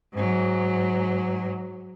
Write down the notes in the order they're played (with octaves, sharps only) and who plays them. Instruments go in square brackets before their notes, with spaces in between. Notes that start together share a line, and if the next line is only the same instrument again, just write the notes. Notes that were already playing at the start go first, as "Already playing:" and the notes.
[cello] G#2 F#3